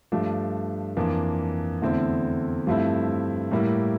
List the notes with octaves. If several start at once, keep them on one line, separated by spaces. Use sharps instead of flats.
G2 F3 A3 D4
F2 E3 A#3 D4
E2 D3 A3 C4 E4
G2 F3 A3 C4 E4
A2 G3 A#3 E4